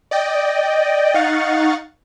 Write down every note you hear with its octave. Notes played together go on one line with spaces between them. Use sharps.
D5 D#5 G5
D#4 F5 F#5 C#6 A6